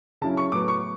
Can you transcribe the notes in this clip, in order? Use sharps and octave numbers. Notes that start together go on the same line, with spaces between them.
C#3 F#3 C#4 E4 A5
C#6
A2 F#3 B3 D6
C#6